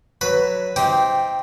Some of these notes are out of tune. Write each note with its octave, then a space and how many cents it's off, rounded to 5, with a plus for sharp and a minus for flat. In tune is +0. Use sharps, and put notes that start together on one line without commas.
F#3 +0 B4 +10 B5 +0
C4 +0 D#4 +30 G4 -10